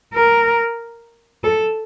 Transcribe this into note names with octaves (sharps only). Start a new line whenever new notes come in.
A#4
A4